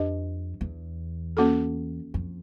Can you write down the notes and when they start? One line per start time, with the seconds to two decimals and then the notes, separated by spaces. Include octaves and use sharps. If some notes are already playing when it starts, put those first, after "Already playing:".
Already playing: F2 D4 G4 B4 D#5
0.61 E2
1.37 A#3 C#4 F#4 A4
2.14 F2